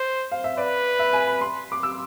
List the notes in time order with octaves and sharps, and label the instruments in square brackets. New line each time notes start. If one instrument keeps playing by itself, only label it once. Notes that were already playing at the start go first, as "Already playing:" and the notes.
Already playing: [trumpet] C5
[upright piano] F5
E5
[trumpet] B4 [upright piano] D5
[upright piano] E5
G#5
B5
C6
D6
E6